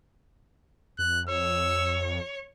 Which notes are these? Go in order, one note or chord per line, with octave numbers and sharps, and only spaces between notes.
F2 F#6
C#5 E6